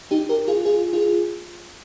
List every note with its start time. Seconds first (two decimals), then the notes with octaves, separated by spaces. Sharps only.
0.11 D#4 G4
0.29 G4 A#4
0.48 F4 G#4
0.65 F4 G#4
0.93 F4 G#4